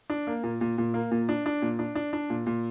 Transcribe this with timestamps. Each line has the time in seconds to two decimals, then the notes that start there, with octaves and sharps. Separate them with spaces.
0.10 D4
0.27 A#3
0.43 A#2
0.61 A#2
0.78 A#2
0.94 A#3
1.11 A#2
1.29 D4
1.46 D4
1.62 A#2
1.79 D4
1.95 D4
2.13 D4
2.30 A#2
2.47 A#2